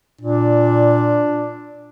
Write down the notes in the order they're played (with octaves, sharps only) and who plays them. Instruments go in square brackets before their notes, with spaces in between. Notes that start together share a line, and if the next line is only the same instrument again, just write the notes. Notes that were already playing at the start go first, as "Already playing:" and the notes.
[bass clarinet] A#2 [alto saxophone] D4